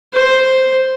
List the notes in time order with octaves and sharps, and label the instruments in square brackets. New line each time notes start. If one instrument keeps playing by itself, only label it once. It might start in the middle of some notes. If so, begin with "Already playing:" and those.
[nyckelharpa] C5